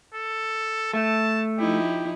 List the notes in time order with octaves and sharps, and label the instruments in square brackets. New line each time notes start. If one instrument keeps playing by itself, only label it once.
[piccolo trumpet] A4
[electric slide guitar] A3 [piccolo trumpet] A5
[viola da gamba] F3 D#4 E4 [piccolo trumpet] G4